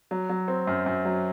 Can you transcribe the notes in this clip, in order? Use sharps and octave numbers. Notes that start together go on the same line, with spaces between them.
F#3
F#3
C4
F#2
F#2
F#3